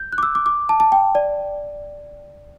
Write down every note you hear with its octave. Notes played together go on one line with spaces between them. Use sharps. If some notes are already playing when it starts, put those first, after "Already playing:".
Already playing: G6
F#6
D6
E6
D6
D6
A5
A5
G5
D5